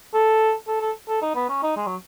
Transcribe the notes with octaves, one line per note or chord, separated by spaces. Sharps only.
A4
A4
A4
A4
D#4
B3
C#4
D#4
G#3
F#3